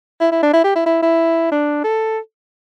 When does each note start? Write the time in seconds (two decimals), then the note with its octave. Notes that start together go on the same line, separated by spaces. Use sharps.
0.20 E4
0.32 E4
0.43 D4
0.53 E4
0.64 G4
0.75 E4
0.86 E4
1.02 E4
1.51 D4
1.84 A4